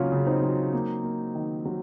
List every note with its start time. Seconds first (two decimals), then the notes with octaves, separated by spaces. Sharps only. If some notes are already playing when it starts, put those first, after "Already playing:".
Already playing: C#3 F#3 A#3 C#4 F4
0.12 C#3
0.27 C4 D#4
0.43 F#3
0.74 A#3
1.04 A#3
1.35 D#3
1.65 F#3